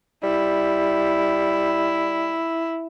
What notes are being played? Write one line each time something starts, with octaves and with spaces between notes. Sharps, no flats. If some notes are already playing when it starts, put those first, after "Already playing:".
G3 E4